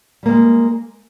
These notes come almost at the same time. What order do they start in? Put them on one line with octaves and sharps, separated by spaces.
G3 A#3 G#3